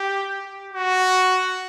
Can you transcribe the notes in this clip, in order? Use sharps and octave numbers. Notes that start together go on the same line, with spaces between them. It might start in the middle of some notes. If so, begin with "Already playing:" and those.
Already playing: G4
F#4